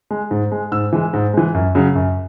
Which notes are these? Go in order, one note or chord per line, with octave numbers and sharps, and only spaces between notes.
G#3
G#2
G#3
G#2 E6
E3 G#3
G#2
E3 G#3
F#2
C#3 F#3
F#2